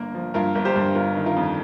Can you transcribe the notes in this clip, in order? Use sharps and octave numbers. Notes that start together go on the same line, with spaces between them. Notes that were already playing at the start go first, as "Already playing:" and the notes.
Already playing: G1 A#3 A#4
F3
G2 F4 A#4
G1 A#4
G4 C5
G2
G1 F4 A#4
D#3
F4 A#4
F2